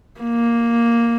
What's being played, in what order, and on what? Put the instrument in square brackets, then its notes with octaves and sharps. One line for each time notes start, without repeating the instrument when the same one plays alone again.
[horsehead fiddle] A#3